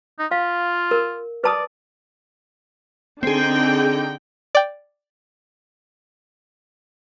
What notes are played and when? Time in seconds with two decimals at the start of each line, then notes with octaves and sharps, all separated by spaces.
0.19 D#4
0.31 F4 F5
0.91 A#4
1.44 B4 D5 A5 D#6
3.23 D3 C4 D#4 G#4 G5
4.55 D5 G5